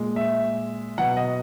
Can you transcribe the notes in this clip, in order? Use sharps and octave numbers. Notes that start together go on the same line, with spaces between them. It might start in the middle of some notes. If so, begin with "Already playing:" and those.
Already playing: A#2 G#3
E5
B2 F#3 F#5
D#5